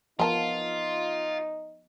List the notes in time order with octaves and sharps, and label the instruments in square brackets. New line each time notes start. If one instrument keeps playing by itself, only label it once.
[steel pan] F3 B3 A#4 [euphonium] D#4 [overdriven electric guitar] F4 [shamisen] A5 A#5